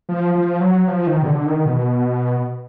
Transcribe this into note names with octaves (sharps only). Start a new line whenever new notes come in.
F3
F3
F#3
F3
D#3
B2
D3
D#3
B2